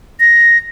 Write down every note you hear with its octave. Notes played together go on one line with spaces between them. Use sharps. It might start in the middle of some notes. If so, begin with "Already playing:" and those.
A#6